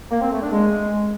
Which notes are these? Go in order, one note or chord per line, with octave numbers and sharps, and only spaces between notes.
A#3
C4
A3
D4
G#3